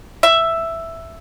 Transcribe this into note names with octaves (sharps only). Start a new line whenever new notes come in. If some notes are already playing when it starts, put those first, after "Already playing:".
E5